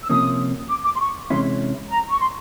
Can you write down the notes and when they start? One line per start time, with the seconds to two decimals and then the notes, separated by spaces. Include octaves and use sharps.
0.03 E6
0.10 C3 F3 A#3 C#4 D#6
0.69 D6
0.84 D6
0.95 C6
1.00 C#6
1.30 C3 E3 G#3 C#4 E4 C6
1.90 A#5
2.10 C#6
2.20 C6